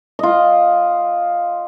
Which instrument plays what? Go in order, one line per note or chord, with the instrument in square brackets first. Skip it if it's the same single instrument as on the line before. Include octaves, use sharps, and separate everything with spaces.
[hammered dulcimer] F4 D#5